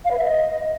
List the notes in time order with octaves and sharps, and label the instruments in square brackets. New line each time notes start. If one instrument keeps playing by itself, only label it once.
[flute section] F5
B4
E5
D#5